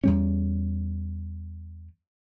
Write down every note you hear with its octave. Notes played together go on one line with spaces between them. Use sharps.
E2 G3 C#4